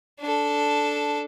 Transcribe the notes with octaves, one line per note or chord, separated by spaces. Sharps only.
D4 A4